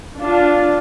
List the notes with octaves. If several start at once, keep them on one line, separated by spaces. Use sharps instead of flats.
D4 F4